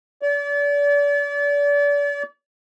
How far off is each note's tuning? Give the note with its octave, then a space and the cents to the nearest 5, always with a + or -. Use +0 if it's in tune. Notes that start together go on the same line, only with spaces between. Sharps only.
D5 -35